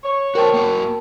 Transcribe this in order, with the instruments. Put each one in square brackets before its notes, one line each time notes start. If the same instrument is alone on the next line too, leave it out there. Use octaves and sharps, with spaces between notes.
[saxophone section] C#5
[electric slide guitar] F#4 C5 [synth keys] A#4 G5 A5
[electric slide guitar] A#3 F#4